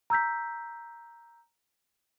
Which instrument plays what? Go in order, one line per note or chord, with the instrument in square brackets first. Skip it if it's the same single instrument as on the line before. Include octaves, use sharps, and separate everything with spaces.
[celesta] A#5 E6 G6 B6